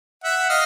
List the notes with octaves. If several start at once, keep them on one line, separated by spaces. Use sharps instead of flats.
E5 F#5
D#5 F5